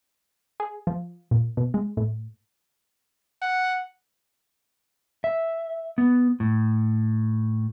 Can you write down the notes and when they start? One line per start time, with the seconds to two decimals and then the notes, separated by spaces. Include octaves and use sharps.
0.60 G#4
0.87 F3
1.31 A#2
1.57 B2
1.74 G#3
1.97 A2
3.42 F#5
5.24 E5
5.98 B3
6.40 A2